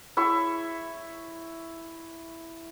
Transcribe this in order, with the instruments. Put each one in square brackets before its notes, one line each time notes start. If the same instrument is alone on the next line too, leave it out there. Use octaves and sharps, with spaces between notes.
[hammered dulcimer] E4 E5 C#6